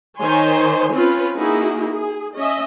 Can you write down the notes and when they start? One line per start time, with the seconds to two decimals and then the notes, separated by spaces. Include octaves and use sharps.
0.19 D#3 C5 C#5 G#5 C6
0.93 C4 C#4 F4 B4
1.37 A#3 D#4 E4 F#4 G#4
1.93 G#4
2.36 C#4 D#5 E5